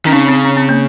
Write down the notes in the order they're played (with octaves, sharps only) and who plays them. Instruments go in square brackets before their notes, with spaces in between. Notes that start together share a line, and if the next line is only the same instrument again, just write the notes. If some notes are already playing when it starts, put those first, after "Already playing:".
[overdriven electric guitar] D#3 [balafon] C#4
[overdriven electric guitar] C#3 [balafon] C4 D#4
[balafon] C4
C#4
C4
A#3